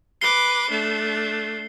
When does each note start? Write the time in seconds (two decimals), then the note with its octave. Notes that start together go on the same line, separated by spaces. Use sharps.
0.21 B4 D6 C7 C#7 G7
0.70 A3 D4